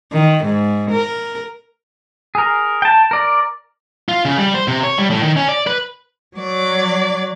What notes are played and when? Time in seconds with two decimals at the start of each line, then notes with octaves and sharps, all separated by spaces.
0.13 D#3
0.45 G#2
0.91 A#4
2.35 G#4 A#4
2.82 G5 A5
3.11 A#4 D5
4.09 F4
4.25 C#3
4.38 G3
4.54 C5
4.68 C3
4.83 C#5
4.98 G3
5.10 A2
5.23 D#3
5.36 C#4
5.48 D5
5.67 B4
6.36 F#3 D5